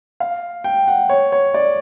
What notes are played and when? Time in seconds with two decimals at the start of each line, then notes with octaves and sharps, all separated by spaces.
0.20 F5
0.64 G5
0.88 F#5
1.09 C#5
1.32 C#5
1.54 D5